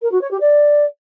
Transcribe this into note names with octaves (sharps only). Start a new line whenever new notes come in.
A#4
F#4
C#5
G4
D5